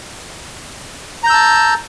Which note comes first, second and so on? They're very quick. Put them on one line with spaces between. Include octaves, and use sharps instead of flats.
A#5 G6 E6 A5